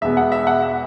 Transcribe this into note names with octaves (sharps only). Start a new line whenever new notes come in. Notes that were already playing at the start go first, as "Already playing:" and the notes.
E1 E2 B2 G#3 B3 E5
F#5
E5
F#5
E5